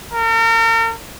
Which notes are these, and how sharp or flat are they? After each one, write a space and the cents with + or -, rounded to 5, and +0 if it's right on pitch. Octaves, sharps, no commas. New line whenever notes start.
A#4 -40